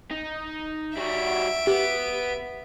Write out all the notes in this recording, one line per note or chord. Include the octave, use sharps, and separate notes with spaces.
D#4
G3 F#4 E5 D7
B3 G4